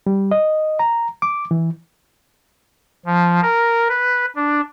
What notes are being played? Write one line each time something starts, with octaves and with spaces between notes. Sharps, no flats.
G3
D#5
A#5
D6
E3
F3
A#4
B4
D4